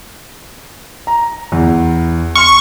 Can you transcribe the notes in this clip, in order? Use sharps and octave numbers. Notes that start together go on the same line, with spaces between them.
A#5
E2
C6 C#6 F6